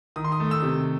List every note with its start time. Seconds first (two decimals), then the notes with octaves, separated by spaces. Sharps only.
0.16 D#3 D#6
0.24 C6
0.32 D#6
0.40 A3
0.51 E6
0.62 C3